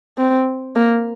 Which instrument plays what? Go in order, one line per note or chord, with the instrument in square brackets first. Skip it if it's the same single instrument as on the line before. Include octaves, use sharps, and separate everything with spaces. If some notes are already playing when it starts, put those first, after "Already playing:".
[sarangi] C4
A#3